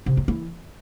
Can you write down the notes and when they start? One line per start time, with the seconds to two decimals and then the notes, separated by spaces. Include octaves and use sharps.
0.06 C3
0.17 F#2
0.28 E3